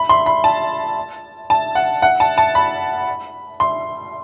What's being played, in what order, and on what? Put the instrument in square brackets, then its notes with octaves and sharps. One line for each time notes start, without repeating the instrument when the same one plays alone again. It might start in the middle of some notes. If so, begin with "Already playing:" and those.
Already playing: [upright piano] B5
C6
B5
A5
A5
F#5
F#5
A5
A5
B5
C6